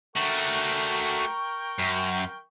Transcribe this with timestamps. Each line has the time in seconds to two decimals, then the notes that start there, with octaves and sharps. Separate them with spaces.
0.16 A3 F#4 A#4 G5 C#6
1.79 F#2